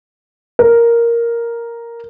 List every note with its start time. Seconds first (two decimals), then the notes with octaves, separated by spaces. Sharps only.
0.59 A#4